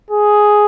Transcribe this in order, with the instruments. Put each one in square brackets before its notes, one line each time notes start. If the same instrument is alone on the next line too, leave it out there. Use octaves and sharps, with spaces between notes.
[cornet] G#4